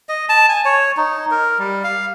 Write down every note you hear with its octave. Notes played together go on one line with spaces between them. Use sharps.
D#5
A5
G#5
C#5
D#4
A#4
G3
F5